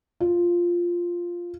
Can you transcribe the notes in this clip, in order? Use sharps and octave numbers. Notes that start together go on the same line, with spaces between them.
F4